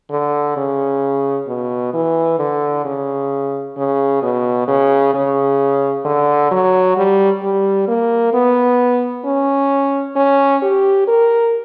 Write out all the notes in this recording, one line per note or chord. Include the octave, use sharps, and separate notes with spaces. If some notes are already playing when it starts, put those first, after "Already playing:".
D3
C#3
B2
E3
D3
C#3
C#3
B2
C#3
C#3
D3
F#3
G3
G3
A#3
B3
C#4
C#4
G4
A#4